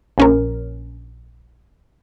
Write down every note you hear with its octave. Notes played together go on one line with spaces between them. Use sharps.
A#1 C#4 A#4